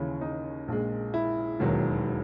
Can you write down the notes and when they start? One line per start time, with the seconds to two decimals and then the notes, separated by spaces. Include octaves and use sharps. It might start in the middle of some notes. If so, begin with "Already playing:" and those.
Already playing: D#2 C#3 E3 C#4
0.21 D#4
0.68 A#1 A#2 G#3
1.14 E4
1.60 E1 D#2 D#3 F#3